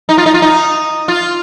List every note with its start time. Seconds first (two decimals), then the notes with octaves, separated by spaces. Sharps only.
0.09 D#4
0.18 F4
0.26 D#4
0.34 F4
0.42 D#4
1.08 F4